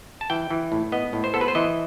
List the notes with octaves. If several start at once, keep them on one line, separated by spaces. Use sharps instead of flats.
A5
E3 G5
E3
A2
B3 D#5
A2
C5
B3 A4
B4
C5
E3 D#5